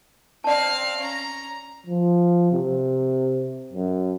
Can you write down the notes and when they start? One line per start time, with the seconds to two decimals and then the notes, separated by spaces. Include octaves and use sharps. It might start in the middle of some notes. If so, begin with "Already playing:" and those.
0.44 C4 D5 F5 A5
0.98 C#4 A#5
1.87 F3
2.52 C3
3.73 F#2